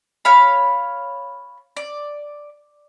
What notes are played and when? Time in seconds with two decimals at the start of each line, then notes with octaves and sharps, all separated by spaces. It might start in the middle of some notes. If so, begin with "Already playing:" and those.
0.25 C#5 F5 B5
1.77 D5